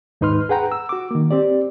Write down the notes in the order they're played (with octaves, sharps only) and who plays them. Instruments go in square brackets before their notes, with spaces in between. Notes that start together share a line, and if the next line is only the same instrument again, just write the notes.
[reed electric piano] D#2 G#2 D#4 B4 C6 F6
G#4 B4 F#5 G5 A#5
E6
F#4 D6
D#3 A#3
C4 G4 D5